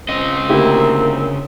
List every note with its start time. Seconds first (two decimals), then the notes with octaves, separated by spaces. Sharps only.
0.09 C#3 C4 D#5
0.49 D2 A#3 E4 G4